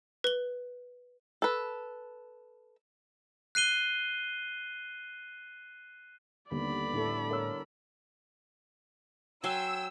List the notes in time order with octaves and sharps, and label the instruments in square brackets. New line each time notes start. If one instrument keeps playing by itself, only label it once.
[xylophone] B4 G7
[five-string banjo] A4 B4
[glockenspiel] F#6 C7 D#7 G7
[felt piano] D#2 [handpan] D3 G3 B3 [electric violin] D5 B5
[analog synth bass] A2 [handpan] D4 E4 A4
[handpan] A#4 [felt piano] C#5 E6
[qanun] F#3 G#5 C6 [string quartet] G5 [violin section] E6